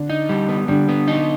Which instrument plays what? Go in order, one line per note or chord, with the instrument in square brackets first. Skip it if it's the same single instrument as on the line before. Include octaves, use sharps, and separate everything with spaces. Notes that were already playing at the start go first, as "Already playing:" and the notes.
Already playing: [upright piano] D3 D4
[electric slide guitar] D#4
G3
B3
[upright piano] D3 D4 [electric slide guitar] G3
[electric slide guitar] B3
D#4